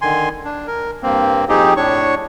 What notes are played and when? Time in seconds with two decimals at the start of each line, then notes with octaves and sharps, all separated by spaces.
0.02 D3 D#3 G#5 C6
0.45 D4
0.67 A#4
1.03 G2 A#3 C4
1.49 F2 C4 D#4 G4 G#4
1.77 A2 D4 C#5 C#6